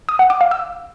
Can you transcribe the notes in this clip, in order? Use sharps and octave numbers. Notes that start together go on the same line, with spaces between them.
D#6
F#5
D6
F5
E6